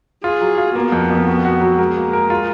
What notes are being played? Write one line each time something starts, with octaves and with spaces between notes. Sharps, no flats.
F4 G#4
F#3
F4
A#3 B3
F2
F2
F#4
F#4
F#3
G#3 A#4
A#3
A#4
F4